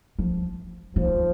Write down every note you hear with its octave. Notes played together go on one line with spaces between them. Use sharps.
F3
D#3 F3